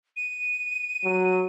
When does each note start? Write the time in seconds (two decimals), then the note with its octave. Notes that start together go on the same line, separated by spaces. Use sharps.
0.16 D#7
1.04 F#3